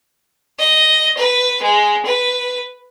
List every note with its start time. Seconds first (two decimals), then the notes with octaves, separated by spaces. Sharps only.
0.59 D#5
1.17 B4
1.62 G#3
2.05 B4